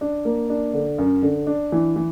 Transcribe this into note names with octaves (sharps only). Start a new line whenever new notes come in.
D4
A#3
D4
D3
F#2
D3
D4
E3
E3